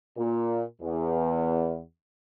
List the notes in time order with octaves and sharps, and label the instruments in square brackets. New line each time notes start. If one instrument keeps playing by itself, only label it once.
[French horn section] A#2
E2